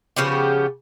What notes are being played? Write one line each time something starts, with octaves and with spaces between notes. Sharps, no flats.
C#3 F3 B3 G4